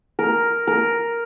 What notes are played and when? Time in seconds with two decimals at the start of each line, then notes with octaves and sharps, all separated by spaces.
0.19 A#4
0.67 A#4